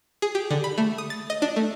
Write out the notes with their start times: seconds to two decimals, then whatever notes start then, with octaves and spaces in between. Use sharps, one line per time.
0.22 G#4
0.35 G4
0.51 D3
0.64 B5
0.78 A3
0.98 D#6
1.10 A6
1.30 D#5
1.42 D4
1.56 A3